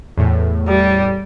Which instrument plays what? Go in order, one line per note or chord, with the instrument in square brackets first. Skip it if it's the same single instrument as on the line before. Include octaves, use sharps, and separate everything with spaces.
[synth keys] E2 A2
[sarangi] G3